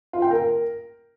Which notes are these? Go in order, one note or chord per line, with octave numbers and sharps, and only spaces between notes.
F4
G5
A#4